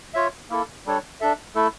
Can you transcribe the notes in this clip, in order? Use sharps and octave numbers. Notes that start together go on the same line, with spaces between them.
F4 C#5 E5
A#3 E4 A4
G3 D4 A4 C#5
D4 A4 E5
A3 E4 A4